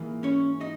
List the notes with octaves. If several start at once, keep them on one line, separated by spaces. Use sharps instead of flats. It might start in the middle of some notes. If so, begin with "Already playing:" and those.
Already playing: G#2 E3 A#3
C#4 C#5
D#4 D#5